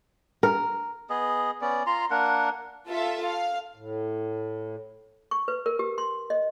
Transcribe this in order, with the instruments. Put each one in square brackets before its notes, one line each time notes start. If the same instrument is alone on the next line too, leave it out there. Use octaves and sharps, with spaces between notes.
[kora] A#4
[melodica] B3 G#4 D#5
B3 C#4 D5
F4 A#5 C6
A#3 D4 A#4 F#5
[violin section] F4 A4 E5
F5
[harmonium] A2
[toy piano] C#6
B4
A#4
G4
C6
D#5